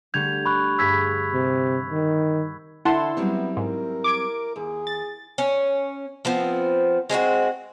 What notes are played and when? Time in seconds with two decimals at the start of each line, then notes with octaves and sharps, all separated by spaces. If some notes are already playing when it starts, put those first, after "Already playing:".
0.14 D3 G3 A3 G6 G#6 F7
0.46 B5 C#6 F#6
0.79 G2 G#4 B5 E6 G#6 B6
1.33 C3
1.91 D#3
2.85 D3 E4 A4 F#5 A5 C6
3.17 F#3 G3 B3 C4
3.57 G#2 A#4
4.04 D6 G#6 D7
4.56 D#2 G#4
4.87 A6
5.38 C#4
6.25 F3 B3 C4
7.09 G#3 C4 E4 F#4